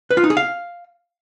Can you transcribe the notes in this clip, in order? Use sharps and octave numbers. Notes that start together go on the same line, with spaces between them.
B4
F4
D#4
G#4
F5